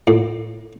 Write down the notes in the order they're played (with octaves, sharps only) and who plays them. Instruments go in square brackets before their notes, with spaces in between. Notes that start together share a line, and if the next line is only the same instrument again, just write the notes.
[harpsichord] A2